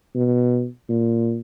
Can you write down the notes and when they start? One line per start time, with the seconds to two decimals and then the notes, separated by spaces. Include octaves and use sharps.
0.15 B2
0.89 A#2